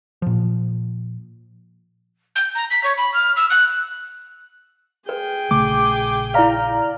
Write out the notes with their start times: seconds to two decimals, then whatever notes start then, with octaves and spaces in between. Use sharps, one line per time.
0.22 A#2 F3
2.35 G6
2.55 A#5
2.70 B6
2.84 C#5
2.97 B5
3.14 F6
3.36 E6
3.50 F#6
5.09 G#4 B4 G5
5.51 A#1 C#3 A3 D6
6.34 E4 D5 F5 A#5 F6